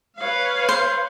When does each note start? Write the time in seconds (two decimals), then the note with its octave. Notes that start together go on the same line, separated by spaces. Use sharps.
0.19 B4 C#5 F5
0.69 C5